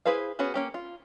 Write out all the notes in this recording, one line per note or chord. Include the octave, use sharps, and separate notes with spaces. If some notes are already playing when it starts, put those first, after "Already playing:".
E4 G#4 B4 C5 F5
B3 C#4 F#4 G#4
A#3 C#4 G4
F4